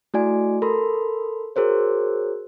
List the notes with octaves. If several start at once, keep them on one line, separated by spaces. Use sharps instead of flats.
A3 E4 F#4 D5 G#5
A4 A#4 B5 C6
F#4 G#4 A#4 C5 C#5